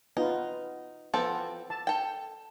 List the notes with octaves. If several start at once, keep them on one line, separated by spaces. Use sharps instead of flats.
B3 D#4 F4
F3 B3 C4 A4 G5
A5
A4 G5